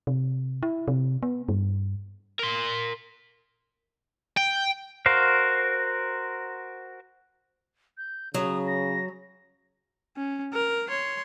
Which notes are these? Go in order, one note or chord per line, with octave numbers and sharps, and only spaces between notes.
C3
E4
C3
B3
G2
A#4 C6
G5
F#4 A#4 C5 F5
G6
C#3 F#3 D#6
A#6
C#4
A#4
C#5 C6